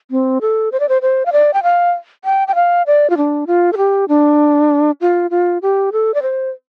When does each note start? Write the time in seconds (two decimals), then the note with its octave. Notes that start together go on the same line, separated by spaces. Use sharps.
0.11 C4
0.41 A4
0.72 C5
0.80 D5
0.89 C5
1.02 C5
1.26 F5
1.32 D5
1.54 G5
1.63 F5
2.25 G5
2.48 G5
2.55 F5
2.87 D5
3.10 F4
3.17 D4
3.47 F4
3.73 A4
3.77 G4
4.09 D4
5.01 F4
5.31 F4
5.62 G4
5.93 A4
6.14 D5
6.22 C5